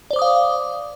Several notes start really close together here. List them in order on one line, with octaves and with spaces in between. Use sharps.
D5 C5 D6 D#6 F5